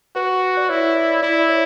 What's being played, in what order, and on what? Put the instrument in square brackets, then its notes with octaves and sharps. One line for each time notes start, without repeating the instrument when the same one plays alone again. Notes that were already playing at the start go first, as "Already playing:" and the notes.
[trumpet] F#4 [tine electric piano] B4
[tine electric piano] D5
[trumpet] E4 [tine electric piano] C#5
[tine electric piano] D5
[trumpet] E4 [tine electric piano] D5
[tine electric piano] D5
C#5